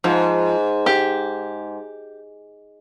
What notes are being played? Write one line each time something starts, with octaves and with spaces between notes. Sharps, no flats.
G#2 F3
G4